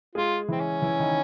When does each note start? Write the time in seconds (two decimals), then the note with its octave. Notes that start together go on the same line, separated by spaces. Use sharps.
0.15 G#3 F4 G#4
0.48 E3 C4 E4
0.60 C#4
0.82 E3 E4
0.99 D#3 D#4